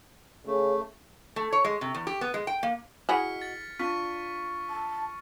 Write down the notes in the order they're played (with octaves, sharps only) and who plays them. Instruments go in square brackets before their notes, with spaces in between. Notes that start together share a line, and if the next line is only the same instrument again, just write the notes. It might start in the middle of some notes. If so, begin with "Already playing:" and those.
[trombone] C#3 [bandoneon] A3
[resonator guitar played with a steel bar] A3
C#5
G#3
C3
E2
G4
B3
G#3
G5
A#3
[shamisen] E4 G#4 [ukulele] F#4 D#5 F#5 [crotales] F6 B6 C#7
[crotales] A6
[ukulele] D4 F4 [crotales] C#6 F6 B6
[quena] A5